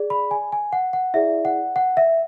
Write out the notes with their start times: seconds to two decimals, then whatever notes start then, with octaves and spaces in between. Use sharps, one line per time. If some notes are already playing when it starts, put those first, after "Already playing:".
Already playing: G#4 D5
0.10 B5
0.31 G#5
0.52 G#5
0.73 F#5
0.93 F#5
1.14 E4 G#4 D5 E5
1.45 F#5
1.76 F#5
1.97 E5